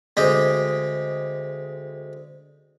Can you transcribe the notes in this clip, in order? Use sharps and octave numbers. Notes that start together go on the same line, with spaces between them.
D2 G#3 C4 G4 D#5